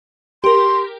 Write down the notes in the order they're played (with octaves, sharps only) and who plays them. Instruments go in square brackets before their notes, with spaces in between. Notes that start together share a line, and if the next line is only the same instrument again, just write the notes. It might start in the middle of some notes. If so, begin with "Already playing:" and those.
[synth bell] G4 A#4 [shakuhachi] C6